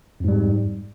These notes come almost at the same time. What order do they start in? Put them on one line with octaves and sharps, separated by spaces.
F2 G#2 G3